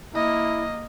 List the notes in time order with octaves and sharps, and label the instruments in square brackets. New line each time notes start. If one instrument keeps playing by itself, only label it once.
[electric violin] A#3 D#5 [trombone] E4